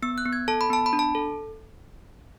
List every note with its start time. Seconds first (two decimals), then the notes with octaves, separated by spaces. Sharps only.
0.02 B3 E6
0.18 F#6
0.26 B3
0.33 G#6
0.48 A4 A5
0.61 B5
0.70 B3 A5
0.86 B5
0.93 D4
0.99 A5
1.15 A4